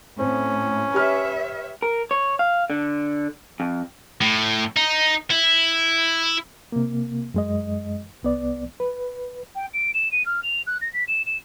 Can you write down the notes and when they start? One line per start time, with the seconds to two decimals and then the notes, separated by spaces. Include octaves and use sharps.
0.19 A2 C4 C#4
0.94 G4 B4 C#5 E5 F6
1.82 A#4
2.11 C#5
2.39 F5
2.70 D3
3.60 F2
4.21 A2
4.77 D#4
5.31 E4
6.72 C3 A#3
7.34 F#2 G#3 D#5
8.23 C2 B3 D5
8.80 B4
9.55 G5
9.73 D7
9.94 E7
10.12 D#7
10.26 F6
10.43 F7
10.67 F#6
10.81 A#6
10.93 B6
11.08 E7
11.26 E7